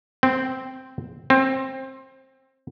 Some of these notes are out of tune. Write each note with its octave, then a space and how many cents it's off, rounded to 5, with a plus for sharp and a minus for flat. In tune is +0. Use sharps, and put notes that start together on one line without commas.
C4 -5
C4 +20